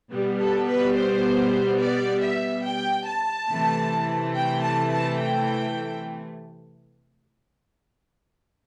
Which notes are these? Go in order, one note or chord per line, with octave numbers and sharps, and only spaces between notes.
B2 G3 B3
A4
B4
C5
D5
E5
G5
A5
C3 E3 A3
G5
A5
A5
G5